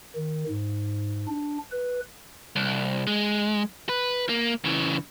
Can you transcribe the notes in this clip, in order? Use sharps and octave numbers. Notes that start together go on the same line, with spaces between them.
D#3
G#2
D4
B4
C2
G#3
B4
A#3
C#3 E3